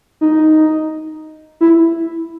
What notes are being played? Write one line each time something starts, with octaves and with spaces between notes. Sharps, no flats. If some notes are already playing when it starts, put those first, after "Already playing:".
D#4
E4